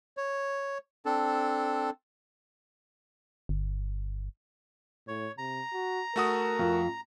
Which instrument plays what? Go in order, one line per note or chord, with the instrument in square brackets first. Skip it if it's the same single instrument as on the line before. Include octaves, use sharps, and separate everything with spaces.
[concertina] C#5
C4 D4 A4
[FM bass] G1
[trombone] A2 [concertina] C#5
[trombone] C3 [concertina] A#5
[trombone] F#4
[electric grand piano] A3 F#4 D#6 [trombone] A#4
[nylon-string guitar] F2